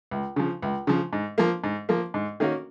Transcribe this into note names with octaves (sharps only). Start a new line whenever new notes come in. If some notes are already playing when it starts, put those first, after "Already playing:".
C#2
C#3 F3
C#2
C#3 F3
G#2
F3 A#3
G#2
F3 A#3
G#2
D#3 A#3 C#4 F#4